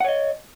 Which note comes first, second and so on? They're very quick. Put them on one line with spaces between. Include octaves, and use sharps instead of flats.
F#5 C#5 D#5